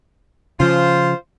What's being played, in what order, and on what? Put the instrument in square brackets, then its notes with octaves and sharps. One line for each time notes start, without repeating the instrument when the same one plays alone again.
[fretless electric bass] C#3 F3 [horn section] F4 C5